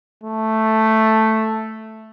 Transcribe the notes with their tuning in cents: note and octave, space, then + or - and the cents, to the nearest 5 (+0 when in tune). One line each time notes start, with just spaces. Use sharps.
A3 +0